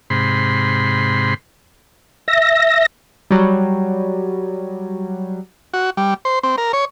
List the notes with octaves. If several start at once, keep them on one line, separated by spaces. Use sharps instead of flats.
G#2 C3 B5 C6
E5 A#6
F#3 G3
F#4
G3
C5
C4
A#4
C#5